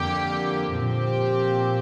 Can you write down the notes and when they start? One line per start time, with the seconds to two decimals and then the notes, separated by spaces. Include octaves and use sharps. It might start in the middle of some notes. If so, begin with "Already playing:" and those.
Already playing: F2 D3 A#3 G4
0.75 A#2 F3 C4 G4